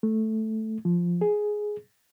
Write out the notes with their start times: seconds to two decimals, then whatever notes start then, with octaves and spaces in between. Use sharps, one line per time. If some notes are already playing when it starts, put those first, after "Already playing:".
0.03 A3
0.85 F3
1.21 G#4